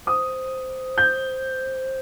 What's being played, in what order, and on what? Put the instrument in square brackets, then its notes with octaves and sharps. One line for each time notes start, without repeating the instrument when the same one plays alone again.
[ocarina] C5 [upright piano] D#6
[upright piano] G6